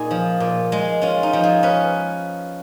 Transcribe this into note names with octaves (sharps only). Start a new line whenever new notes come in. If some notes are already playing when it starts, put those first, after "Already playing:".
Already playing: A#2 D#4 G#4
F3
A#2
G#3
C#4 F4
D#4
F3
G#4
C#4 B4